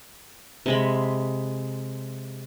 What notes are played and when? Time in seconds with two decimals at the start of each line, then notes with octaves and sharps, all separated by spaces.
0.66 C3 G#3 B5